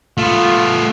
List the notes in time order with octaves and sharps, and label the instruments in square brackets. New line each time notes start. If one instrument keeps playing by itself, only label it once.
[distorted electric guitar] A3 B3 [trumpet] F4